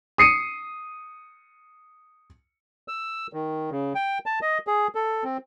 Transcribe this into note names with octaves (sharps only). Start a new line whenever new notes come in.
D#6 C7 C#7 D#7
E6
D#3
C#3
G5
A5
D#5
G#4
A4
C4